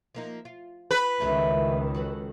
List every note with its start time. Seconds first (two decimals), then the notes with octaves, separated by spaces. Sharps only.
0.15 F3 A#3 D#4
0.45 F4
0.91 B4
1.20 C#2 D#3 E3 F#3 A3
1.95 F#4 A4 B4